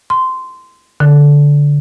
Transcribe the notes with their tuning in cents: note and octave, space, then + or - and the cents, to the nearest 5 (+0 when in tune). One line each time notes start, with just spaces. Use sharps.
C6 -15
D3 -15